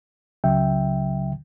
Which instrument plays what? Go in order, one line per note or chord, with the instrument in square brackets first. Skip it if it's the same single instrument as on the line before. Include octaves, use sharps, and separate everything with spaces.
[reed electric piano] C#2 C#3 F#3 E5 G5